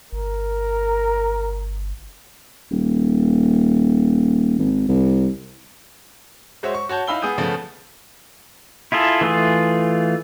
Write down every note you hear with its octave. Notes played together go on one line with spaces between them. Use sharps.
G1 A#4
D#1
G#1
C2
G#3 F#4 C5 C#5 E5
C#6
F#4 C#5 A5 G6
D#4 E4 F5 B5 E6 G7
B3 G#4 D#6 G6 D#7
C#3 F3 A3 B3
E4 F4 G#4 A4
E3 A3 F4 G#4